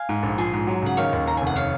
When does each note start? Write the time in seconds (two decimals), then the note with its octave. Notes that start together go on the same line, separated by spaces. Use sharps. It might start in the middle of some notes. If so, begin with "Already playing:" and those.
Already playing: F5 G#5
0.09 G#2
0.23 A#1
0.38 F3 G#5 C6
0.53 G#2
0.67 F#3
0.83 C#3 F#5
0.97 D#3 C#5 F5
1.13 D#2
1.27 D#2 A#5
1.37 F1 G#5
1.47 F#5
1.56 C#5 F5